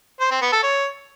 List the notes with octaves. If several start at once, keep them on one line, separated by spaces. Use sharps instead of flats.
C5
C4
B3
A4
C#5